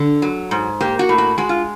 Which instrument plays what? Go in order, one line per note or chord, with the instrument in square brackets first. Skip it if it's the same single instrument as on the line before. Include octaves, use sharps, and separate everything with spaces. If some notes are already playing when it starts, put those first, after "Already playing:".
Already playing: [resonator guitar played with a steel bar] D3
F#3
G#2
A#3 G4
F#4
A2
F#4
G#3 F#4
F4